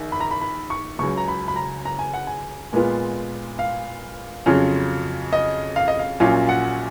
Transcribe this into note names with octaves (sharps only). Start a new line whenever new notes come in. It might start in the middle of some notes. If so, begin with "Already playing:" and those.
Already playing: A#1 D#3
B5
A#5
B5
B5
C#6
C#2 C#3 F#3 C#6
A#5
B5
B5
A#5
A#5
G#5
F#5
G#5
A#2 G#3 B3 F4
F5
F2 C#3 F#3 C#4 F4
D#5
F5
D#5
F5
A#1 A#2 F#3 C#4 F4 F5
F#5